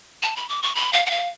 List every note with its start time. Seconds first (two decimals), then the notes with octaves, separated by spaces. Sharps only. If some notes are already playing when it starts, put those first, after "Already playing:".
0.23 A5
0.36 B5
0.49 D6
0.63 C#6
0.75 B5
0.93 F5
1.06 F#5
1.10 F5